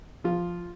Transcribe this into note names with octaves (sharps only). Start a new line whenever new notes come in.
F3 F4